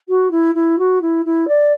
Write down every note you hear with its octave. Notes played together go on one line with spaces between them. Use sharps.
F#4
E4
E4
F#4
E4
E4
D5